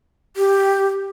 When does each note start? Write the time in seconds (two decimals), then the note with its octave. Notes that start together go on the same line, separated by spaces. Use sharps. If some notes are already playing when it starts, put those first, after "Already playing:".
0.37 G4